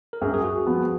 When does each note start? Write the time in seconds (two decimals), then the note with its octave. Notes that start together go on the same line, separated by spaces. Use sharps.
0.13 A#4
0.22 F#2 G#4
0.34 G#4
0.44 F#4
0.66 F3 B3